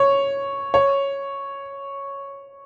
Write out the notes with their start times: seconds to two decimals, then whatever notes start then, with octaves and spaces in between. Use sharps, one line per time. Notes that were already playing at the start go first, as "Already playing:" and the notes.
Already playing: C#5
0.74 C#5